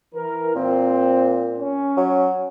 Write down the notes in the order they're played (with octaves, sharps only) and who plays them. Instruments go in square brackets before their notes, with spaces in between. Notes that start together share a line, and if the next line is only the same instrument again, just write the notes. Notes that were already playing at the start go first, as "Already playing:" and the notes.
[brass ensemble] E3 A#4
[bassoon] A#2 [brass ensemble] C4
[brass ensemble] C#4
[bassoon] F#3